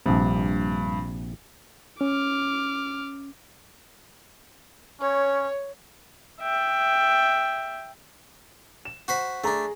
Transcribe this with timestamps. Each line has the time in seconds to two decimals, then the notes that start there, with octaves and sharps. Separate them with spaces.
0.06 A#1 G2 C3
2.01 C#4 D6 F6
5.01 C#4 C#5
6.41 E5 G5
8.85 E7
9.08 F#4 C5 B5
9.44 A3 D4 G#4 A#5